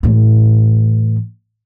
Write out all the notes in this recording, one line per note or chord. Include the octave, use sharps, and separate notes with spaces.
A2 E3